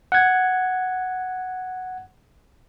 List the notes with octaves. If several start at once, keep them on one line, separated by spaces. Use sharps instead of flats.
F#5 G#6